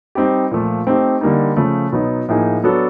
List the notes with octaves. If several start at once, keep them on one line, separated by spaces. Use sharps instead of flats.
G3 C4 D#4 G4
A#2 F3 A3
A3 C4 D#4 G4
D3 G3 A#3 D#4
C#3 F3 A3
B2 F#3 B3 D#4
A2 F3 A#3 D#4 G#4
F#3 B3 D4 F#4 A4